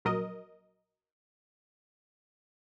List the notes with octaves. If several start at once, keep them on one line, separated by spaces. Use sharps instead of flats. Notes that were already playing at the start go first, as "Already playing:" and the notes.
A#1 F#3 A#4 D#5